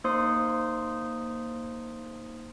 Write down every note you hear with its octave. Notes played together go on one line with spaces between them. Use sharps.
A#3 D#4 C5 C6 D#6